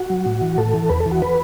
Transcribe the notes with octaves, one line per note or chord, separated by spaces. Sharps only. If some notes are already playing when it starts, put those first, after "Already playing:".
Already playing: F#4
F#3
A2
E3
A2 A4
E3
E2 B4
A4
E3
F#4
B4